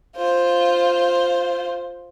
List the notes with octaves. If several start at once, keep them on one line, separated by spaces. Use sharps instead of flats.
F4 C5